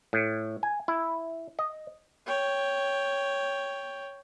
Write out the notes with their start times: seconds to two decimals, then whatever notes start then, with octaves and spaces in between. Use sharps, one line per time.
0.13 A2
0.63 G#5
0.88 E4
1.59 D#5
2.27 C#5 G5